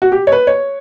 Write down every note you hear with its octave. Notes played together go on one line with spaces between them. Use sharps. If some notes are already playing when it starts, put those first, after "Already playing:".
F#4
G4
C#5
B4
C#5